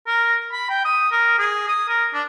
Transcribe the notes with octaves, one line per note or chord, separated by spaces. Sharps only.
A#4
B5
G5
D#6
A#4
G#4
D#6
A#4
D4